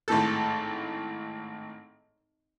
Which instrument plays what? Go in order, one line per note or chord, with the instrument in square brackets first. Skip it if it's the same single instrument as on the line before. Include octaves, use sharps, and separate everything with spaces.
[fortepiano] G#1 A2 A4